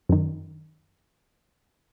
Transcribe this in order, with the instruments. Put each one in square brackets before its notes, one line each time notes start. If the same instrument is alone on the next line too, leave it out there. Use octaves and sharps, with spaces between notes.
[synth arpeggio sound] F#2 D#3